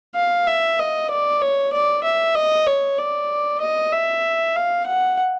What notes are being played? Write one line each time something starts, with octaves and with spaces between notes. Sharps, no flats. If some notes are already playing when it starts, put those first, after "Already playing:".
F5
E5
D#5
D5
C#5
D5
E5
D#5
C#5
D5
D#5
E5
F5
F#5